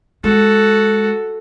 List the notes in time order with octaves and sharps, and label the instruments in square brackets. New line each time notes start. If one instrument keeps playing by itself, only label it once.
[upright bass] G#3 [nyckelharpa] F#4 A4